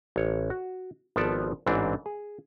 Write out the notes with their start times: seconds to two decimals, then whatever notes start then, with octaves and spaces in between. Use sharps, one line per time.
0.16 A1 C#5
0.50 F#4
1.16 G#1 F3 B3 A4 D5 A5
1.66 A1 G#2 E3 C4 D4 C5
2.06 G#4